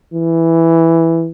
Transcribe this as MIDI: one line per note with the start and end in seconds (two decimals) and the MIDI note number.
0.14 1.31 52